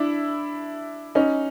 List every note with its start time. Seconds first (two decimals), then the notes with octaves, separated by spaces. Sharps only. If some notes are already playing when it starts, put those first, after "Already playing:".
Already playing: D4 E4
1.15 C#4 D#4